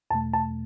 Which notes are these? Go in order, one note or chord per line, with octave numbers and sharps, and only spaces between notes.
E2 B2 A3 A5
A5